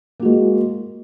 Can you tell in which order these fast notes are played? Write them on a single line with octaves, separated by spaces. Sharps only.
A#3 F#4 G#3